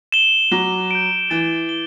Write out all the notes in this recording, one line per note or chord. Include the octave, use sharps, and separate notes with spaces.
E7 G7
F#3 D6
G6 D7
E3 A6
G7